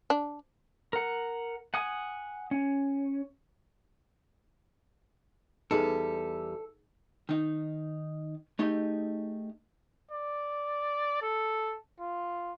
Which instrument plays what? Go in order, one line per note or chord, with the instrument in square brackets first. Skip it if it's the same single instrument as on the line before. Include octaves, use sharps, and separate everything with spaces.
[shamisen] D4
[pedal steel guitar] A#4 F#5
F#5 G#5 D#6
C#4
[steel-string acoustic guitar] E2 G3 [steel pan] D#4 G#4 [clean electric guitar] A4
[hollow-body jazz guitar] D#3 D#4
A3 D#4 G4 G#4 D#5
[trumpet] D5
A4
F4